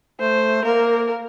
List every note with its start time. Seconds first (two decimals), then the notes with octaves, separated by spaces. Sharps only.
0.20 A3 C5
0.64 A#3 A#4